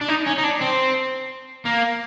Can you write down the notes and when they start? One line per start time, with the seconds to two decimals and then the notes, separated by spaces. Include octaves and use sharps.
0.01 D4
0.08 D#4
0.26 C#4
0.38 D#4
0.43 D4
0.61 C4
1.66 A#3